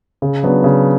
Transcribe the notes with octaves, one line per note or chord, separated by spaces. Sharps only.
C#3
F#3 B3 D4
C#3